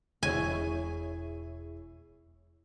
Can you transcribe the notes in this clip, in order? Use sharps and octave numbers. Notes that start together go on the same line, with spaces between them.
E1 E4 G#4 C#5 G#5